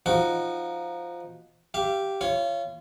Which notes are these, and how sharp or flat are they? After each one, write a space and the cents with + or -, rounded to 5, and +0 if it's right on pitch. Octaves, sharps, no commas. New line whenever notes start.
F3 +0 D#4 +0 F#4 +0
G4 -5 F5 -35
F4 -30 C#5 +0